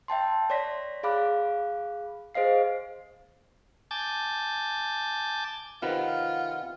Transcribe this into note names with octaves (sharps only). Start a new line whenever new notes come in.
E5 G5 A5 C6
C#5 D5 C6 A#6 B6
G#4 F5 B5 D6 F#6
G#4 C5 D#5 F5 C7
G#5 A5 D6 G6 A6
C3 D#3 F4 B4 F#5